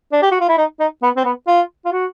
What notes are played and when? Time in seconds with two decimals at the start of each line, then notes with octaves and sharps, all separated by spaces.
0.12 D4
0.22 G4
0.31 F#4
0.40 F4
0.49 E4
0.58 D#4
0.80 D#4
1.02 B3
1.17 C4
1.25 B3
1.47 F4
1.85 F4
1.92 F#4